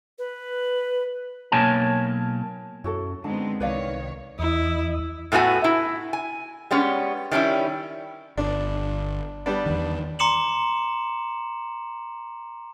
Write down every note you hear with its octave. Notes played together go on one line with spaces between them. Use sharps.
B4
B1 B2 A#3 C#5 G#5 A5
F#2 E4 F#4 A4
D3 G#3 B3 C4 D#4 A5
C2 D#3 B4 C#5 D5 F5
E2 E4 D#5
A2 A3 B3 F#4 G#5
E4
G#5
G3 G#3 B3 C#4
D#3 G3 C#4 E4
G1 D4
G3 B3 D4
E2 D#3
A#5 C6 D6 C#7 E7 F#7